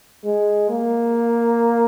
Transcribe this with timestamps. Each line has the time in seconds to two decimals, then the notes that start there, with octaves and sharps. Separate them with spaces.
0.25 G#3
0.70 A#3